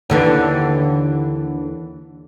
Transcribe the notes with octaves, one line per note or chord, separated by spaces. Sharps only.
D#2 D3 E3